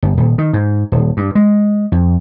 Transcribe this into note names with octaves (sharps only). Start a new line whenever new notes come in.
G1
D#1
D#3
G#2
D#1
G2
G#3
F2